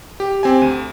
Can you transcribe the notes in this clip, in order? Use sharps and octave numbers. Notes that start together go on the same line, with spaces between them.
G4
C4 G4 G#5
D2 D#7